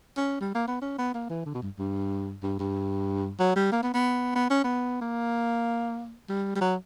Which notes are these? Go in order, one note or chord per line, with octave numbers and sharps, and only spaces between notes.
C#4
G3
A#3
B3
C#4
B3
A#3
E3
D3
B2
G2
G2
G2
G2
F#3
G3
A#3
B3
B3
B3
C#4
B3
A#3
G3
G3
F#3